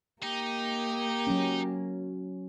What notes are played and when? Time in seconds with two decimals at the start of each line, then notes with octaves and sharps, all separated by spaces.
0.22 A#3 D#4 G4
1.27 F#3 C#4